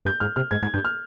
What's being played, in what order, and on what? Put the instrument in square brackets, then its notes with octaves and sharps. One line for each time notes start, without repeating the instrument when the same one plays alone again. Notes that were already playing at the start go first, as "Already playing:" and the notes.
[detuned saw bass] G2 [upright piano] G6
[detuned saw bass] G#2 [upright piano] F6
[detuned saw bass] C3 [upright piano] F6
[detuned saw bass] G#2 [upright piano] G#6
[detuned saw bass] G#2 [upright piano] G#6
[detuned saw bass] G2 [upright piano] G6
[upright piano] F6